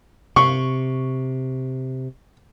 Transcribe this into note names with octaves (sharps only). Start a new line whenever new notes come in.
C3 C#6